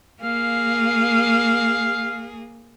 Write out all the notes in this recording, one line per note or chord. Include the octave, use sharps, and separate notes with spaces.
A#3 G#4 F5